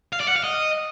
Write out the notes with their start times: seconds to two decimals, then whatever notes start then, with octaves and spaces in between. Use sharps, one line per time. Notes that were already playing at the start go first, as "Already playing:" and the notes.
0.13 F5
0.20 D5
0.28 F#5
0.36 F5
0.44 D#5